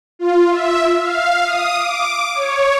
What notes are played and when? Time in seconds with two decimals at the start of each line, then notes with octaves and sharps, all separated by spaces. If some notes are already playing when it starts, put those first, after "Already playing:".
0.19 F4
0.50 E5
0.98 F5
1.44 D#6
1.76 D6
2.35 C#5